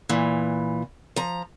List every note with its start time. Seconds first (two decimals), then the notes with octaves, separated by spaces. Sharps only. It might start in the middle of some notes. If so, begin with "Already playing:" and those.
0.09 A#2 E3
1.16 F3 A#5